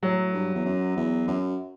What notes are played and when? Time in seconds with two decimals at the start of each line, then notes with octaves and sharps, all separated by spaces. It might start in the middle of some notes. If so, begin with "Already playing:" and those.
0.03 A2 F#3
0.34 G2
0.55 E2
0.65 F#2
0.96 E2
1.27 F#2